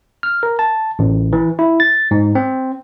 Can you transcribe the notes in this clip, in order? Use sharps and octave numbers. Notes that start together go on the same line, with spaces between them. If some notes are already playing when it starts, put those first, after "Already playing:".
F6
A#4
A5
A1
E3
E4
A6
G#2
C4